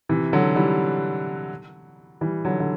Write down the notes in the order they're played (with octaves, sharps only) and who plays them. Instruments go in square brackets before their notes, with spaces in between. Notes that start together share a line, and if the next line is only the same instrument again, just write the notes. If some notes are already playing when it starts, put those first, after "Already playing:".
[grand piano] C3 E3
D3 F#3
E3 G3
E3 G3
D3 F#3
D3